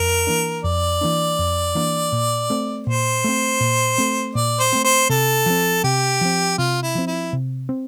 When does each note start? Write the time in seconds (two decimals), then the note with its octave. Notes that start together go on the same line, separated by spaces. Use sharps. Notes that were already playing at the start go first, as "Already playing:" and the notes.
Already playing: F2 A#4
0.27 E3 A#3 D4
0.64 F2 D5
1.01 E3 A#3 D4
1.39 F2
1.75 E3 A#3 D4
2.12 A#2
2.50 A3 C4
2.87 A#2 C5
3.24 A3 C4
3.60 A#2
3.98 A3 C4
4.35 A#2 D5
4.60 C5
4.73 A3 C4
4.84 C5
5.09 C3 A4
5.46 F3 C4
5.84 C3 G4
6.21 F3 C4
6.58 C3 F4
6.83 E4
6.95 F3 C4
7.07 E4
7.33 C3
7.69 C4